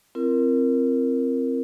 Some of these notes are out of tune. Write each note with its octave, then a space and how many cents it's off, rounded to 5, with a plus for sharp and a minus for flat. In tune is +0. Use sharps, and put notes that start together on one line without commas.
C4 +5 F4 -45 A#4 +0